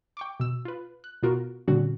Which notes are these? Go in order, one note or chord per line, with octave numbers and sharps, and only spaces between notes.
G5 C#6 D6
B2 E6
F4 B4
F#6
B2 B3 F4 F#4 A#4
A#2 D3 G3 C4 C#4 F#4